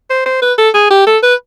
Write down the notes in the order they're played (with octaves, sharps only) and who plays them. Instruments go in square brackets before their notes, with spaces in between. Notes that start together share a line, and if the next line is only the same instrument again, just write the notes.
[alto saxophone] C5
C5
B4
A4
G#4
G4
A4
B4